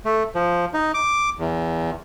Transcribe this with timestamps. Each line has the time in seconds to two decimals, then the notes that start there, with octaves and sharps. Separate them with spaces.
0.05 A3
0.35 F3
0.74 D#4
0.94 D6
1.39 E2